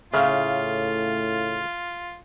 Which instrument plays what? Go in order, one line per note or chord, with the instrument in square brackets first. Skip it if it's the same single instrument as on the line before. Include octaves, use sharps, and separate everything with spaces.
[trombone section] A2 [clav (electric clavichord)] C#3 [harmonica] F4 [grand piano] E5 F5 F6